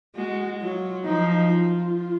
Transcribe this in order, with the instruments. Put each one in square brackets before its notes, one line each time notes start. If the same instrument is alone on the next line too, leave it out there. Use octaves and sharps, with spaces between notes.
[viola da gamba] G#3 [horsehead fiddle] F#4
[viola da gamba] F#3 [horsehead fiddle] F4
[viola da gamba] F3 [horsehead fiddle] D#4
[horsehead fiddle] F4